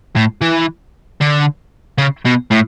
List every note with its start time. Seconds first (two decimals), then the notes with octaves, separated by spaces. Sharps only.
0.16 A2
0.42 E3
1.21 D3
1.98 C#3
2.25 B2
2.51 A2